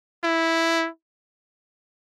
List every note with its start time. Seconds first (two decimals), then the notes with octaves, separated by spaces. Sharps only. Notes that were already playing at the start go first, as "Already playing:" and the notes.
0.24 E4